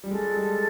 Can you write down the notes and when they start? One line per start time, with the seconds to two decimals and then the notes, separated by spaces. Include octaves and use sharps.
0.04 G3
0.11 G#3 A4
0.34 G3